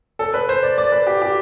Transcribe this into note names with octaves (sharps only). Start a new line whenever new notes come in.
A4
B4
C5
D5
D5
B4
G4
G4